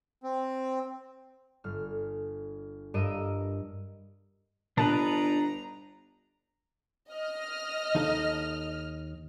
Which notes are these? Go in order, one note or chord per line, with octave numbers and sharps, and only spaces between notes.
C4
G1 F6
G2 A#4 D#5 E6 D7 D#7
G1 A#2 D4 D#4 B4 A5 A#5
D#5 F6
D#2 D#4 A4